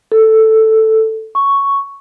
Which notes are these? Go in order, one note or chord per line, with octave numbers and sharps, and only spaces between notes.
A4
C#6